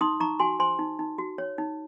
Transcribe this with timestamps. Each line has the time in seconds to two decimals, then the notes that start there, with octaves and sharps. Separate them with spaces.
0.01 D#4 C6 D#6
0.20 D#4 A#5 C#6
0.39 F#4 G#5 C6
0.59 C5 G#5 C6
0.79 D#4
0.99 D#4
1.18 F#4
1.38 C#5
1.58 D#4